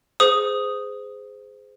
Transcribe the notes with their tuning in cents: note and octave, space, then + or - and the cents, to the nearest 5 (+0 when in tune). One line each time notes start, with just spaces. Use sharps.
G#4 +0 C5 -25 D#6 +0